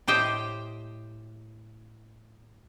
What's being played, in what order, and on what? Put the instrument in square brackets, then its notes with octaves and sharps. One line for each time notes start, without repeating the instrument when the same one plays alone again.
[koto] A2 G4 C5 D#5 G5